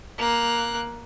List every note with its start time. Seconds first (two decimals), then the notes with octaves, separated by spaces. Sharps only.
0.18 A#3 F#6